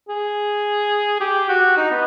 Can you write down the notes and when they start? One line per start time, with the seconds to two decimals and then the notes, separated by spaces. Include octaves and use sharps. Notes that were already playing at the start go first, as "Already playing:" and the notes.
0.09 G#4
1.20 G4
1.49 F#4
1.77 D#4
1.91 B3